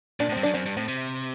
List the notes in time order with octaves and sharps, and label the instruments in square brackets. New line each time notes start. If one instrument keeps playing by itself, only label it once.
[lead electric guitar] A#2 [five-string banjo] D4
[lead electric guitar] A2
[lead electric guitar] G2 [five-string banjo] C4
[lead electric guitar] F#2 [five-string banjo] D4
[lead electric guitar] F#2 [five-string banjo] C4
[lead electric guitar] G2
[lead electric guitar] A2 [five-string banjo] C4
[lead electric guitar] C3